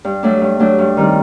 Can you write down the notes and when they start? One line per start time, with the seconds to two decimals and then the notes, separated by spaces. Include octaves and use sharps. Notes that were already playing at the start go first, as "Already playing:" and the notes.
0.05 G2
0.23 F#3 A3 D4
0.41 G2
0.59 F#3 A3 D4
0.79 G2
0.97 D#3 G3 C4